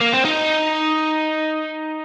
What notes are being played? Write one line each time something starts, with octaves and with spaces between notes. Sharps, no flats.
A#3
C4
D#4